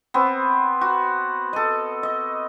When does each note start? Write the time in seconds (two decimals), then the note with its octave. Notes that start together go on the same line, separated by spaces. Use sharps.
0.14 B3 C4
0.81 F#4
1.53 A4 D#5
2.03 D#5